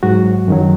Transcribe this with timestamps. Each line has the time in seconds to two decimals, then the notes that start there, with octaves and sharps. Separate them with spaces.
0.03 G#2 F#3 F#4
0.48 F#2 D#3 F#3